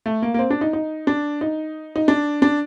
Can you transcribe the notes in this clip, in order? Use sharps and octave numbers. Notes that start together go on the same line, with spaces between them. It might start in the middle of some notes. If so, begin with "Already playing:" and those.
A3
A#3
A#3
C4
D4
D#4
D#4
D4
D#4
D#4
D4
D4